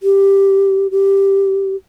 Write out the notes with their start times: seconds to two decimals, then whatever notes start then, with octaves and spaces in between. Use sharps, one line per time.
0.03 G4
0.91 G4